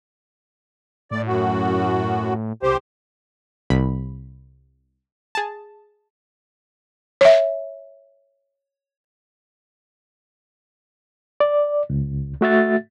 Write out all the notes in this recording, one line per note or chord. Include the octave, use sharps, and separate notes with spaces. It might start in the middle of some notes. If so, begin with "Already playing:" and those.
A2 D5
F#2 F#4
C2 G4 C5
C2 B5
G#4 A5
C#5 E5
D5
C#2
A3 F#4 E5 A6